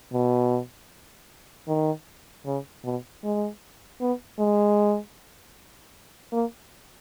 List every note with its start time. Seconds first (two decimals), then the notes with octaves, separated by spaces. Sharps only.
0.13 B2
1.68 D#3
2.46 C#3
2.84 B2
3.24 G#3
4.01 B3
4.39 G#3
6.32 A#3